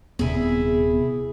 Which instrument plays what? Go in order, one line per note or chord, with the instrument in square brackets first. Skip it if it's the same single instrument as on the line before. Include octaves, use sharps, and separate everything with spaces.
[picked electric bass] D#1 C3 [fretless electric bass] B3 [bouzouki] E4 G#4